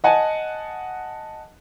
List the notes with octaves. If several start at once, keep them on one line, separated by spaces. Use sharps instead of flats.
D#5 F#5 G#5 A5